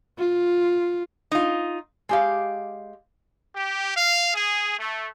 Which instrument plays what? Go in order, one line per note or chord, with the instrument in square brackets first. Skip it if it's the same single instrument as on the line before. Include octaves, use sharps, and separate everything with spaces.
[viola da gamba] F4
[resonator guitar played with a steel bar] D#4 F4
G#3 G4 F5
[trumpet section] G4
F5
G#4
A3